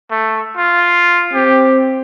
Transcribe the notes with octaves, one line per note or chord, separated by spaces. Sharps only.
A3
F4
C4 G4